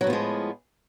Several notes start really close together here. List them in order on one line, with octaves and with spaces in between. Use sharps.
F#3 A2 B3 F3 G#3